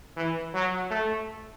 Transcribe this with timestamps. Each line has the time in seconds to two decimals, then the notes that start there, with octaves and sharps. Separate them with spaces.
0.17 E3
0.54 F#3
0.91 A3